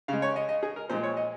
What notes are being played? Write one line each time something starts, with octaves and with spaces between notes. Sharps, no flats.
C#3 G#3 F5
C#5
D#5
D#5
G#4
A#4
A#2 F3 G#3 C5
C#5
D#5